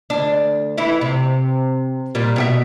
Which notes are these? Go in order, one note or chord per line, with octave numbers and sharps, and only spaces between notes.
D2 D4
E3 E4
C3
A#2 G3
B2 F#4 E5